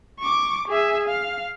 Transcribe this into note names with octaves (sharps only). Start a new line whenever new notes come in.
C#6 D6
G#4 E5
F5